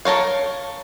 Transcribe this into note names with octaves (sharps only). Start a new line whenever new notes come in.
A4 A#4 C#5 F5